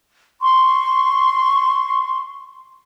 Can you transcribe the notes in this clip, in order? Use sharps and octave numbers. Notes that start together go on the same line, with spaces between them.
C6 C#6